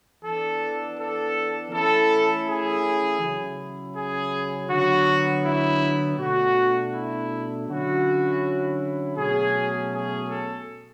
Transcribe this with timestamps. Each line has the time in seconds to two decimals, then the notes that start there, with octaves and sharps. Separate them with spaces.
0.22 E3 B3 D4 A4
0.97 A4
1.71 E3 A3 C#4 E4 A4
2.46 G#4
3.21 C#3 F#3 C#4 E4
3.95 G#4
4.69 D3 F#3 B3 F#4
5.44 E4
6.18 B2 A3 D4 F#4
6.93 E4
7.68 D3 F#3 C#4 E4 F#4
9.17 B2 F#3 A3 C#4 G#4
9.91 G#4
10.28 A4